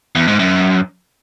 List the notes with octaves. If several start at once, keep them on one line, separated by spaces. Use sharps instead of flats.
E2
G#2
F#2